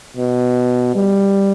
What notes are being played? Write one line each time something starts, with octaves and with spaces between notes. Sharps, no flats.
B2
G3